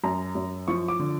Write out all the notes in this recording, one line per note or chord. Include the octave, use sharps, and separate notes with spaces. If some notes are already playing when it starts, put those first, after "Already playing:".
F#2 A#5
F#2
F3 C#6
D6
D3